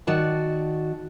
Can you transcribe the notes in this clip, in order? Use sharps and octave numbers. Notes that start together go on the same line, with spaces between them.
D#3 F#4 D5 A5